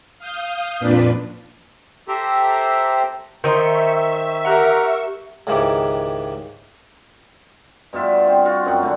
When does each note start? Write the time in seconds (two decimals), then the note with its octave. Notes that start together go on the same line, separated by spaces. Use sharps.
0.19 F5 D#6 G6
0.79 F2 A#2 D4 B4
2.08 G4 A4 C5 E5 G5 A#5
3.44 D#3 C5 D#5 E5 A#5 C6 C#6
4.45 G4 A#4 F#5 A#5 F#6
5.47 C#2 G#2 D#3 E3 G4
7.93 G2 B2 F4 E5
8.27 C4
8.45 F4 F#4 C#6
8.65 F#2 C4 D#4 F#5
8.83 D3 A3